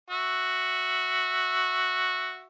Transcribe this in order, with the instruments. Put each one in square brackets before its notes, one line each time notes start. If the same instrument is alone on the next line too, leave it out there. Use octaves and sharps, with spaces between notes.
[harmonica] F#4 E5